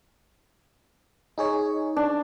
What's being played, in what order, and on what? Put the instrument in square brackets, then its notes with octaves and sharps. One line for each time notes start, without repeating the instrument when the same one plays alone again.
[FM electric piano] D#4 G#4 C#5
[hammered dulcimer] D4